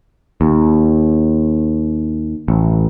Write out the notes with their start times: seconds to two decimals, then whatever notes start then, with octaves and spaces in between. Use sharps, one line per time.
0.41 D#2
2.48 A1